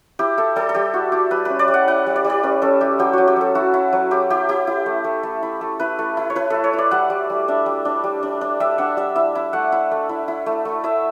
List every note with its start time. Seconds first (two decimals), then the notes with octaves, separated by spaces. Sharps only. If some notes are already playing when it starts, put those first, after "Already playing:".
0.19 E4 G4
0.38 E4 A4
0.56 G3 A4
0.69 A4
0.75 G3 G4
0.94 E4 F#4
1.12 E4 G4
1.31 G3 B4
1.45 C#4 B4
1.59 D5
1.68 G3
1.74 F#5
1.88 E4 F#5
2.06 G3
2.16 D5
2.24 G3
2.30 D5
2.43 C#4 B4
2.62 C#4 A4
2.81 E4 G4
2.99 F#3 G4
3.13 F#3 F#4
3.28 G4
3.36 F#3 A4
3.55 E4 F#4
3.74 E4
3.93 F#3
4.11 E4 G4
4.30 E4 G4
4.49 E4 G4
4.67 E4
4.86 A3
5.04 A3
5.23 A3
5.43 E4
5.61 A3
5.80 E4 B4
5.99 A3
6.17 E4
6.30 C#5
6.36 E4 B4
6.50 A3 A4
6.64 C#5
6.73 E4
6.78 D5
6.91 G3 F#5
7.10 G3
7.30 G3
7.48 D4 E5
7.66 G3
7.85 D4
8.04 G3
8.23 D4
8.41 D4
8.60 G3 E5
8.78 D4 F#5
8.97 G3 E5
9.15 E4 E5
9.35 E4
9.53 A3 F#5
9.72 E4
9.91 A3
10.09 E4
10.28 E4
10.46 A3
10.65 A3
10.84 E4 E5